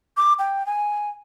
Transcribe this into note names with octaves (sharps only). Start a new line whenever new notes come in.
D6
G5
G#5